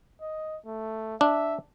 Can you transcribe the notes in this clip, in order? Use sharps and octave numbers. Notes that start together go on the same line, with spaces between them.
D#5
A3
D4 E5